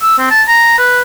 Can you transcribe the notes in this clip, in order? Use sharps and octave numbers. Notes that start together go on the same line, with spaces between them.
E6
C4
A5
A#5
B4